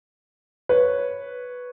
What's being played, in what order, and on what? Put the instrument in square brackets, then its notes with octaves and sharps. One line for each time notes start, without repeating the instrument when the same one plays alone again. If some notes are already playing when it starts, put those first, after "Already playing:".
[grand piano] B4 C#5